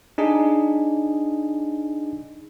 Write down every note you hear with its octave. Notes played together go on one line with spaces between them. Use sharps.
D4 D#4 G#4 D#5